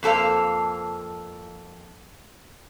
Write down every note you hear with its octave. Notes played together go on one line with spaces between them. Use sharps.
F2 A#3 A4 C5 F5